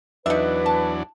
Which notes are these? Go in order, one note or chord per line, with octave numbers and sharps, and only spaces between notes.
E2 F#3 D4 D#4 B4 E5
A5